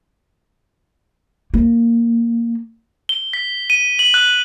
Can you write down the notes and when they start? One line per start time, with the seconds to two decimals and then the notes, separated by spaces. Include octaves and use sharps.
1.54 A#3
3.09 G7
3.33 B6
3.70 D#7
3.99 F#7
4.14 F#6